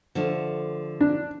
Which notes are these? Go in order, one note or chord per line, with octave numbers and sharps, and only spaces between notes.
D3 F3 A3
D4